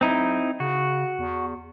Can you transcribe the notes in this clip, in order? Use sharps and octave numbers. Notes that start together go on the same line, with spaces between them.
B1 C4 D#4 E4
C#3 F#4
E2